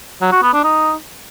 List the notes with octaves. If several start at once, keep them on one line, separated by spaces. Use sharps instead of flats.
F#3
F#4
B3
D4
D#4